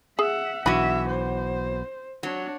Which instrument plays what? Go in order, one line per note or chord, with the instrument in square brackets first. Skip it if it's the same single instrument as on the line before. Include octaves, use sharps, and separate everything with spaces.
[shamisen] G#4 [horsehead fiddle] E5 F#5
[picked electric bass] B1 [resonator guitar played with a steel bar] E3 F#4 [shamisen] D4 B5 [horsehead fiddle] E5
[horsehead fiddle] C5
[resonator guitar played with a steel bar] F#3 [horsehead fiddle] D4 C#5